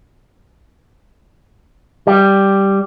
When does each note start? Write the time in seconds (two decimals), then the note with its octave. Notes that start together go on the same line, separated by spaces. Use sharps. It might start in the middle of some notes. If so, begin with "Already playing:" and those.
2.07 G3